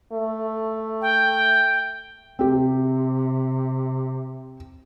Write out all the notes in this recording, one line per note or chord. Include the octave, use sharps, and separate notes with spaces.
A3
G5
C3 C4 G4